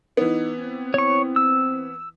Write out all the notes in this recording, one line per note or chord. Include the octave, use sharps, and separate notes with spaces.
E3 B3 D#4
C4
C#5 C#6
E6